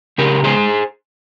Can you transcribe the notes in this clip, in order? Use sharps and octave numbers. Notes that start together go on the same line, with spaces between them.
C#3 G4 A#4
G#3 G#4 C5